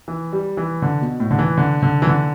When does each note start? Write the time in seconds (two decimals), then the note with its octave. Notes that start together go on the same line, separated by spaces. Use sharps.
0.08 E3
0.33 G3
0.57 E3
0.82 D3
1.01 B2
1.20 A2
1.31 D3
1.39 E3
1.58 D3
1.83 D3
2.02 E3
2.07 D3